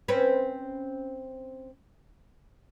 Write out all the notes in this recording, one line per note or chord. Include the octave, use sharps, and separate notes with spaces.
C4 C#4 B4